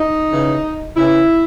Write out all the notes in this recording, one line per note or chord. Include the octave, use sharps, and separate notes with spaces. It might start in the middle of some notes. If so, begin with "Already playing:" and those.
Already playing: D#4
C#3 E3
C#3 E3 E4